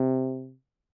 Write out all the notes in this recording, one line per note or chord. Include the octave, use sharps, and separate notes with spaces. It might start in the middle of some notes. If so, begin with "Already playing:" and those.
Already playing: C3